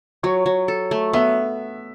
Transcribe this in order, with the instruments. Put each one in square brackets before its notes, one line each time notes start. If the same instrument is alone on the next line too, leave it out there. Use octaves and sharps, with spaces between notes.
[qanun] F#3 [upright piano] C#5
[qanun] F#3
A4
A3
[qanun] B3 [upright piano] E5